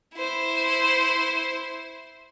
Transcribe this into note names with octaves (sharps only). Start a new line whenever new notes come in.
E4 C5